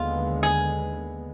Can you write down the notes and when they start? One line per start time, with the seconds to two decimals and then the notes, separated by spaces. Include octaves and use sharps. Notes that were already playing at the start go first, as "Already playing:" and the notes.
Already playing: D#2 D3 G#3 B3 F4
0.43 G#4